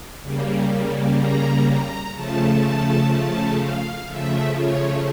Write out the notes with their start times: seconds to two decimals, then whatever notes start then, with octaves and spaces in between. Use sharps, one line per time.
0.23 C#3 G3 A#3
1.19 A#5
1.67 A#5
2.14 C#3 F3 A3 A5
2.63 A5
3.10 A5
3.59 F5
4.07 C#3 F3 A3 E5
4.55 C#5